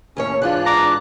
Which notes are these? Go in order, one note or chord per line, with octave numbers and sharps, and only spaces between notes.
D#2 A2 C#4 C#5
G#2 E3 G#3 D4 F4 F#6
A#5 D6